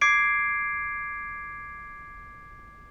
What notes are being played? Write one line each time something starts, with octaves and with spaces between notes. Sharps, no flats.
D6 G#6 C7 D7